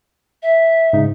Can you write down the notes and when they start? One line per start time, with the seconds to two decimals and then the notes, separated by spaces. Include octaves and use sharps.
0.42 E5
0.93 G#2 C#3 D#4